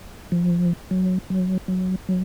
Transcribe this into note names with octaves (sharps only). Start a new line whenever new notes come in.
F3
F#3
F#3
F#3
F#3